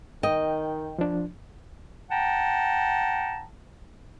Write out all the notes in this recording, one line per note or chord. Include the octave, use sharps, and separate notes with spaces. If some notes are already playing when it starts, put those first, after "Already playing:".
D#3 D#5 G5
F3 D4
F#5 G5 A5 A#5